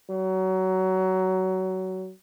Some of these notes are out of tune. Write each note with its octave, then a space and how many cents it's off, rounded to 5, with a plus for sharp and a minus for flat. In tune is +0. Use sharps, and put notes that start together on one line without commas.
F#3 +20